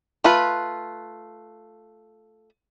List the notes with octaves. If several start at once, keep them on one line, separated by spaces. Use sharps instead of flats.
A3 F4 B4